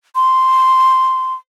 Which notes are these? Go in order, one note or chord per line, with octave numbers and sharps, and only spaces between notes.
C6